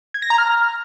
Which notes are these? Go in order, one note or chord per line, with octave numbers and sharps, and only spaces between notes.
G#6
A#6
A#5
F6